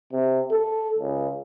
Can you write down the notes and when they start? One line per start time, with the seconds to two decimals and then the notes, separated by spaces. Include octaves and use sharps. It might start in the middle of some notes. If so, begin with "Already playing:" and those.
0.12 C3
0.51 A4
0.99 C#2